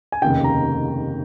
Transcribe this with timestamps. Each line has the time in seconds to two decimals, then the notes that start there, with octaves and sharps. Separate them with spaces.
0.12 G#5
0.22 F1 D#2 C#3 G5
0.44 A#5